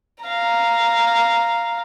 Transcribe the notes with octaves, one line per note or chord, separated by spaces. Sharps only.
F5 A#5